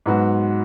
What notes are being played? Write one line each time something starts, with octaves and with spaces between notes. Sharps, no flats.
G#2 F#3 B3 F#4